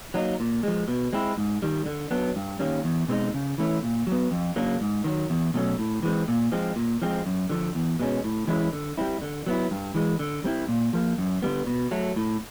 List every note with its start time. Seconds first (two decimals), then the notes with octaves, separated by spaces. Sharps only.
0.14 F#3 A#3 D#4
0.40 A#2
0.63 F3 G#3
0.88 B2
1.13 G#3 C4 E4
1.38 G#2
1.62 D#3 G3
1.86 D3
2.11 F#3 B3 D4
2.36 G2
2.59 D#3 G3 A#3 C#4
2.84 E2
3.08 B2 G#3 C4 D#4
3.34 C#3
3.58 E3 A3 C#4 E4
3.83 A#2
4.07 F#3 B3
4.31 F2
4.56 C#3 F#3 A#3 D4
4.81 G#2
5.04 D#3 F#3
5.30 E2
5.54 B2 F#3 A3 C#4
5.79 A2
6.03 E3 G#3 C4
6.28 A#2
6.52 F3 G#3 C4
6.76 A#2
7.02 F3 G#3 C4
7.26 F#2
7.49 D3 F3
7.75 E2
8.00 B2 G#3 C#4
8.24 A2
8.48 E3 G#3 C#4 E4
8.73 D3
8.98 G3 C4 E4
9.22 D3
9.47 F#3 B3 E4
9.71 G2
9.95 E3 G#3
10.19 D3
10.44 G3 C4 E4
10.69 A#2
10.93 F3 A#3
11.18 F#2
11.42 D3 G3 B3
11.66 B2
11.91 F#3 A3
12.16 A2